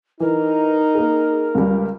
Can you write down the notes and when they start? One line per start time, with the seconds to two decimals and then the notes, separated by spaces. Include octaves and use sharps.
0.20 E3 D#4 A#4
0.95 A#3 G#4
1.55 C#2 G3